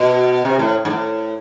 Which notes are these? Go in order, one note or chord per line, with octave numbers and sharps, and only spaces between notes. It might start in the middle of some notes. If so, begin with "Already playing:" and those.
Already playing: B2
C3
A2
G#2
A2